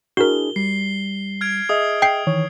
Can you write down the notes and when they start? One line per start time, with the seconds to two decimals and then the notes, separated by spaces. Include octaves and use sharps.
0.17 D4 E4 F#4 G#4 A#4 G7
0.56 G3 C7
1.41 F6 G#6 D7
1.69 G#4 D#5 E5 D#6
2.02 G5 C7
2.27 D#3 E3 C#5